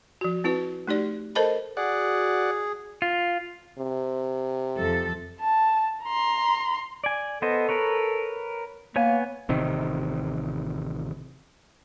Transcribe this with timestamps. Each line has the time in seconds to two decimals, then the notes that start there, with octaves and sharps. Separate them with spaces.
0.21 F3 F#4
0.44 C4 E4 F#4 B4
0.87 A3 D#4 G4 D5
1.35 A4 A#4 C5 D#5 A5 B5
1.77 F#4 G#4 D5 F#5
3.02 F4
3.78 C3
4.76 F2 F3 A4
5.40 A5
6.03 A#5 C6
7.04 D5 G#5
7.42 B3 A4 C5 D#5
7.69 A#4 B4 C#5
8.96 A#3 B3 C#5 G#5
9.49 A1 C3 D#3